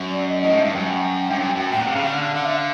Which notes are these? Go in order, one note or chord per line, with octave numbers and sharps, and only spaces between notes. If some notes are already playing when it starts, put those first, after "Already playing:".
Already playing: F#2
D5
D#5
A2 D#5
G#2 E5
G2
F#2 G5
G2
F#2
F#2
A2 G5
A#2 F#5
C3
F5
C#3
D3 F5
F#5
F5
D3 F#5
E5
F5